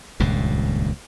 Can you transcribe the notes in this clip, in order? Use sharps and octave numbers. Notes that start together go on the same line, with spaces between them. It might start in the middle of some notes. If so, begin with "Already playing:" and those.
D#1 C#2 G2 A#2